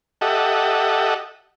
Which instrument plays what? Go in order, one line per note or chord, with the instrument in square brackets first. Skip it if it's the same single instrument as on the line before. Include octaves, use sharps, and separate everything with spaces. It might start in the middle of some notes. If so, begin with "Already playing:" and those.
[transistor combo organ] G4 A4 D#5 E5 F#5